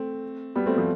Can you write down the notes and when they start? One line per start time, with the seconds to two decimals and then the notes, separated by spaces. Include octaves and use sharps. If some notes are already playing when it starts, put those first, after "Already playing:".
Already playing: A3 C4
0.55 G3 B3
0.66 A3 C4
0.77 F3 A3